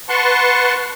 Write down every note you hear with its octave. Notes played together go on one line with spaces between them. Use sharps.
B4 F#5 A5 C6 C#6